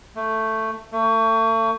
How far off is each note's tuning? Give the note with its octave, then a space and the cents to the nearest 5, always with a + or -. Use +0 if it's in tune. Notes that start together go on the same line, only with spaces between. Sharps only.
A3 +10
A3 +35